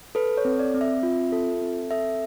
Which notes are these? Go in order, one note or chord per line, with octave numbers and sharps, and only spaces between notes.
A4 B4
C#5
C4
D5
C4
E5
F4
A4
C4
A4 E5